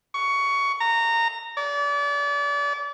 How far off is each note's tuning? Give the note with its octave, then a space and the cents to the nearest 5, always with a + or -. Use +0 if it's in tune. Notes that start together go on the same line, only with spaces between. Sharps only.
C#6 +15
A#5 -20
D5 -35